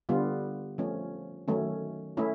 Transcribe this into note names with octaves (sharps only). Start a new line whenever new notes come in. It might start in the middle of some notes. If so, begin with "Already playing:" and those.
D3 G3 B3 F4
F3 A3 C#4
D#3 F#3 A3 C#4
A3 C#4 E4